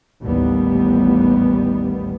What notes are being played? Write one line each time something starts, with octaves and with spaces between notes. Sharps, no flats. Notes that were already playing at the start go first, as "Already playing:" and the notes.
A1 D#2 A2 G3 B3